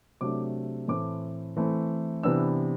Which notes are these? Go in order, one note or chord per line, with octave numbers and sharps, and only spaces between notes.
C3 F#3 A3 D4 D6
A2 E3 A3 C4 D6
E3 A3 C4
C3 E3 B3 D4 E6